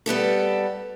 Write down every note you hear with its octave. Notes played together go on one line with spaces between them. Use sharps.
G3 B3 G4 A4